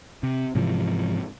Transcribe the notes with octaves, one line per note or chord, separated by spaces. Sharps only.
C3
G#2 C3 E3 F3